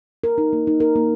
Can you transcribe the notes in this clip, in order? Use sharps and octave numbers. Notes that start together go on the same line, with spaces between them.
A#4
D#4
A#3
D#4
A#4
A#3